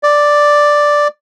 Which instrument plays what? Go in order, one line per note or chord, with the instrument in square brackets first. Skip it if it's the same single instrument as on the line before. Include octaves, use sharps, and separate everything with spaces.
[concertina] D5